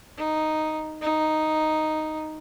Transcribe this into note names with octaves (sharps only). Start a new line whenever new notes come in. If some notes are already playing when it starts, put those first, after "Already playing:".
D#4
D#4